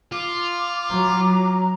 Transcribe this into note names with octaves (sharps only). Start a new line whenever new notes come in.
F4 D6
F#3 A#5